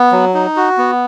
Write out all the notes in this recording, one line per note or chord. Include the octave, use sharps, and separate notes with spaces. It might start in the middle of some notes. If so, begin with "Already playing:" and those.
Already playing: B3
F#3
D#4
F#4
B3